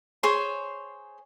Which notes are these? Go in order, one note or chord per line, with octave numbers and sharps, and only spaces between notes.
G#4 C5 C#5 C6